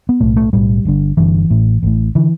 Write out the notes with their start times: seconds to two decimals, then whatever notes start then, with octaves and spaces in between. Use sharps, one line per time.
0.09 B3
0.20 B1 A2 A3
0.36 A3
0.53 B1 A2 G3
0.85 G1 G2 D3
1.17 G1 G2 D3 E3
1.50 A1 A2
1.83 A1 A2
2.15 D3 E3